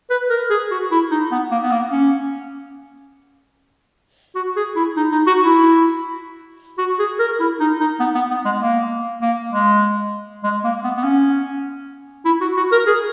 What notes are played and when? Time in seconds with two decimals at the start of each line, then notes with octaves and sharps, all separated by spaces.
0.10 B4
0.30 A#4
0.50 G#4
0.71 F#4
0.92 E4
1.11 D#4
1.32 B3
1.51 A#3
1.63 B3
1.72 A#3
1.92 C#4
4.35 F#4
4.56 G#4
4.76 E4
4.97 D#4
5.12 D#4
5.27 F#4
5.43 E4
6.78 F#4
6.99 G#4
7.19 A#4
7.40 E4
7.60 D#4
7.80 D#4
8.00 B3
8.15 B3
8.31 B3
8.45 G#3
8.61 A#3
9.22 A#3
9.52 G#3
10.44 G#3
10.64 A#3
10.84 B3
10.97 B3
11.04 C#4
12.25 E4
12.41 F#4
12.57 F#4
12.72 A#4
12.87 G#4